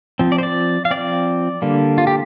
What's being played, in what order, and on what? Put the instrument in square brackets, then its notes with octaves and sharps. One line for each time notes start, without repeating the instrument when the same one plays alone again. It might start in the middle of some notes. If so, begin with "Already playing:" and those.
[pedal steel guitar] F3 C4
D5
C5
D5
F5
F3 C4 D5
D3 G3 A#3
F4
G4